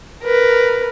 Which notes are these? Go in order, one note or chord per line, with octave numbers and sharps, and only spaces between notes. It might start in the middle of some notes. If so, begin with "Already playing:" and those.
A#4 B4